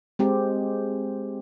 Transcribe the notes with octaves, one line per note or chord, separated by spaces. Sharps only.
G#3 C4 G4